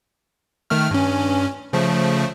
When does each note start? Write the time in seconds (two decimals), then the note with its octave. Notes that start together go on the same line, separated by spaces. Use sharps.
0.70 D#3 A3 F6
0.91 G2 C#4
1.73 C#3 F3 A3